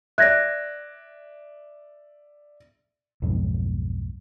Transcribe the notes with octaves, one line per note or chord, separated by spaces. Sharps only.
D5 E5 F#6 G#6 A#6
B1 F2 G#2